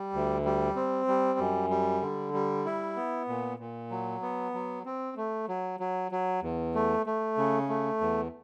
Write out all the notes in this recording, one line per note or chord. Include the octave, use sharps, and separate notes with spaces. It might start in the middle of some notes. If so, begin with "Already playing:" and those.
Already playing: G3
D2
G3
C4
G3
F#2
G3
D3
G3
E4
B3
A#2
A#2
F#3
B3
F#3
C4
A3
F#3
F#3
F#3
E2
A3
A3
C#3
A3
E2